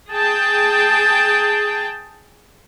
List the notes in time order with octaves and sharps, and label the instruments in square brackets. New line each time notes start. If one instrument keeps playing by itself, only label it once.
[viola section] G#4 G5 A5